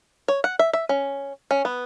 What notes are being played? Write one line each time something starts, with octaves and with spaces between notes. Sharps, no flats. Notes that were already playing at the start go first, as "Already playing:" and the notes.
C#5
F#5
E5
E5
C#4
C#4
B3